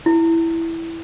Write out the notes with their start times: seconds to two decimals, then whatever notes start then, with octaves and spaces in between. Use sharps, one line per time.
0.06 E4